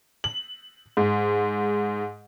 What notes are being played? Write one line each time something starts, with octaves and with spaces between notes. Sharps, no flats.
F#7
G#2